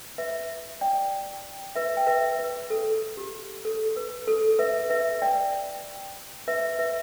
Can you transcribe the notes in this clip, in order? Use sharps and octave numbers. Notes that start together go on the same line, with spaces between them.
B4 E5
D5 G5
B4 E5
G5
B4 E5
B4
A4
G4
A4
B4
A4
B4 E5
B4 E5
D5 G5
B4 E5
B4 E5